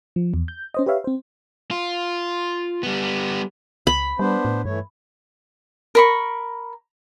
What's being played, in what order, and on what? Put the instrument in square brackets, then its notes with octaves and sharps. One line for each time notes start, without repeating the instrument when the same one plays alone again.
[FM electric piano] F3
E2
G6
C#4 C5 D#5
G4 B4 C#5 E5 F5
C4 C5
[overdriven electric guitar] F4
G3 B3
[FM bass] C#2 [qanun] B5
[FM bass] G3 [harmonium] B3 D4 C5
[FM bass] A2
[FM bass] G2 [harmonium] E3 A3 C#5
[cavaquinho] A#4 B5 C#6